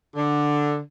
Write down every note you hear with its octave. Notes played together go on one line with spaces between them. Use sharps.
D3